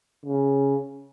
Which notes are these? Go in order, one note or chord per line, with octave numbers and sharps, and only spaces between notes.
C#3